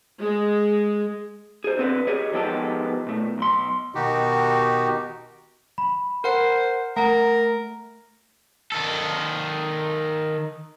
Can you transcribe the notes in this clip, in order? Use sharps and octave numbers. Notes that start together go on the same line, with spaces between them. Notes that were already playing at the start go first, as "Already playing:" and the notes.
G#3
G#4 C5
D3 C4 B4
G4 G#4 C#5 D#5
D#3 F3 G#3 B3 G4 A4
B2 A3
B1 C6
B2 D#3 D#4 F#4 G4
B5
A#4 C5 F#5 C7
A3 A#4 F#5 A#5
D#3 A4